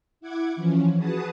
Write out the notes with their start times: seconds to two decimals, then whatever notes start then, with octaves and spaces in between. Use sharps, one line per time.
0.21 E4 F#5 D6 G#6
0.56 E3 F3 C#4
0.97 F#4 G#4 B4 A5 D#6